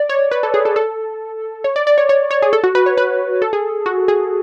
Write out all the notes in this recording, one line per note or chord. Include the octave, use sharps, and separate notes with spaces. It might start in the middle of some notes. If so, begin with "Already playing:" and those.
Already playing: D5
C#5
B4
A4
G#4
A4
A4
C#5
D5
D5
C#5
C#5
C#5
G#4
A4
F#4
B4
C#5
B4
A4
G#4
F#4
G#4